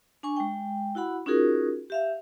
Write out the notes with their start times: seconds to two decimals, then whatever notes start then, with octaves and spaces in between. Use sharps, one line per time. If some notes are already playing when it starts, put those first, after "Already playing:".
0.23 D4 G#5 C#6
0.36 G#3 G5
0.95 E4 F#4 F#5 B5
1.26 C#4 D#4 F4 F#4 G#4 A#4
1.90 G4 E5 F5